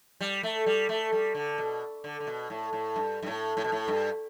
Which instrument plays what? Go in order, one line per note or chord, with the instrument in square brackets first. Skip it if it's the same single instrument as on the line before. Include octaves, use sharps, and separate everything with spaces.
[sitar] G3
A3
G3
A3
G3
D3
B2
D3
D3
B2
A2
A2
G2
G2
A2
A2
B2
A2
G2